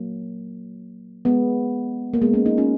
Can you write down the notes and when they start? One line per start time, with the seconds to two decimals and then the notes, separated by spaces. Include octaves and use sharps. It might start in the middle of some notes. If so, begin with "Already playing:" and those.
Already playing: F#3 A#3
1.25 G#3 B3
2.14 A#3
2.22 G#3 B3
2.34 A#3 C#4
2.45 B3 D#4
2.57 C#4 F4